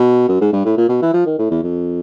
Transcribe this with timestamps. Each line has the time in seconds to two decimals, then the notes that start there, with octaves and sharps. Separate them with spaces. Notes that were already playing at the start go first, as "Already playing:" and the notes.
Already playing: B2
0.28 F#2
0.41 G#2
0.53 G2
0.65 A2
0.78 A#2
0.89 B2
1.02 E3
1.14 F3
1.26 D#3
1.39 A2
1.51 E2
1.63 F2